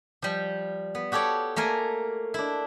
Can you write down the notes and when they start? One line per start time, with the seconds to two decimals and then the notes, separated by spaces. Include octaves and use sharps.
0.22 F3 G3
0.95 B3
1.12 F#4 G4 A4 C#5 D5
1.56 A3 A#3 A#4 G#5
2.34 D4 E4